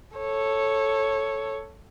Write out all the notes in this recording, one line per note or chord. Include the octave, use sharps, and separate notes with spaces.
A4 C#5